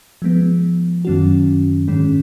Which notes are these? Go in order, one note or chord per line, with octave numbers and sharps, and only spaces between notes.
F3 G#3 B3
F#2 D#3 F#3 C#4 F#4
G#2 D#3 G#3 C#4